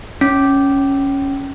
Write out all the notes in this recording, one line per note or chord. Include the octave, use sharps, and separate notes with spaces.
C#4